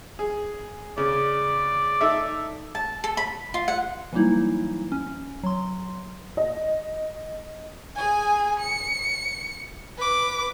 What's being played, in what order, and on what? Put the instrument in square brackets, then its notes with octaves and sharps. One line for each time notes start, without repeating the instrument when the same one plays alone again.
[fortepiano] G#4
[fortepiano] C#3 [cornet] D5
[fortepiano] D#4 A4 E5
[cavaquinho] A5
A4
B5
F4
F#5
[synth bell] E3 F#3 G3 A#3 D#4 E4
C#4
F#3 C6
[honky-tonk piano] D#5
[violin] G#4 G#5
C#7
B4 D6